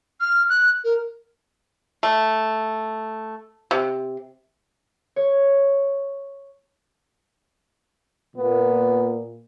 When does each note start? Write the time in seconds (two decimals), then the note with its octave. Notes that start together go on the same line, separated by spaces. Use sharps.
0.21 F6
0.49 F#6
0.84 A#4
2.03 A3
3.71 C3
5.16 C#5
8.37 A#2 B3